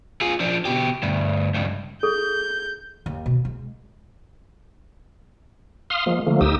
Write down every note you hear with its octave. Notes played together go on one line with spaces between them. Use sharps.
F4 G#4
F3 D4
B2 G4
D2 G2
C#2 G2
G#4 A4 G6
D#2
B2
G#3
F5 C6 D#6 F6
F3 G#3 A#3
D3 F3 A3 A#3
D2 D#4 G4 D#6 E6